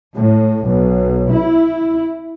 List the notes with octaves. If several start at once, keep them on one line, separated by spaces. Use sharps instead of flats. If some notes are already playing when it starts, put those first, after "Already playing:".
A2
B1
E4